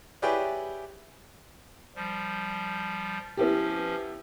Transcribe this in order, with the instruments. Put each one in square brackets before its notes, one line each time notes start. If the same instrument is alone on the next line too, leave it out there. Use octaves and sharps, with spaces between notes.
[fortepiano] E4 G4 G#4 B4 C#5 D5
[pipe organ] F3 G3
[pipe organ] F3 C#4 [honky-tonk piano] B3 E4 G4